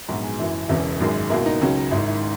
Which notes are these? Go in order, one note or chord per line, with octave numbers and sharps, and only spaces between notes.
A#1 G#2 F#3 B3 F#4
G#4
F#1 F#2 E3 E4
E1 E2 C#3 E3
G#1 F#2 D#3 G#3
C#2 B2 A#3 E4
D#4
C#2 C#3 F#3
G#1 G#2 D#3 E4
E4